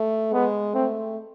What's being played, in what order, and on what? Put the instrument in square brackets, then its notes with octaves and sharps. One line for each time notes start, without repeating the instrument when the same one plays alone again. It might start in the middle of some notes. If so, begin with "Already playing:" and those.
Already playing: [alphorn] A3
[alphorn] G#3 [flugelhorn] B3
[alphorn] A3 [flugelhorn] C4